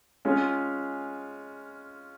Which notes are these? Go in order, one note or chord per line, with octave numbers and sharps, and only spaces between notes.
G#3 C#4 F4